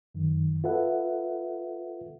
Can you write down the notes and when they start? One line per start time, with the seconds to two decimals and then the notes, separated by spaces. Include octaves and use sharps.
0.15 F#2 D#3
0.64 F4 A4 B4 E5 F#5